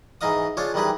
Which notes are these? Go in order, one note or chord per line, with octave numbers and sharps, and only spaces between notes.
G#2 E3 D#4 D#5 F5 D#6
D4 F4 G#4 C5 C#5
D#3 E3 G3 D#4 G#4 B4